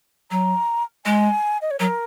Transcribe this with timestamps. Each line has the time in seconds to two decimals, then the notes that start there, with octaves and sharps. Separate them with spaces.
0.31 F#3 A#5
1.06 G#3 G#5
1.62 D#5
1.71 C#5
1.80 F#3 A#4